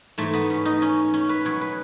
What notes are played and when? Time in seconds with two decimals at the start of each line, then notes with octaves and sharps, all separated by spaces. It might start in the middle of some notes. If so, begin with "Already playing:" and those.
0.18 G#2 E3 G#3 A3
0.34 B3
0.50 C#4
0.65 D#4
0.82 C#4
1.14 C#4
1.29 B4
1.45 B2 F#3 C#5
1.61 B4